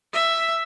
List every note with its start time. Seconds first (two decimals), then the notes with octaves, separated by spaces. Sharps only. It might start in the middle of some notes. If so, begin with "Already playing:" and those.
0.13 E5